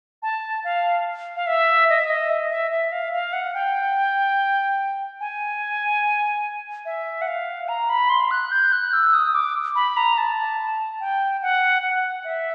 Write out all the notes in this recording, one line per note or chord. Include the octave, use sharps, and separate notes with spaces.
A5
F5
F5
E5
D#5
E5
D#5
E5
E5
E5
F5
F5
F#5
G5
G#5
E5
F#5
F5
A#5
B5
C6
F#6
G6
F#6
E6
D#6
D6
B5
A#5
A5
G5
F#5
F#5
E5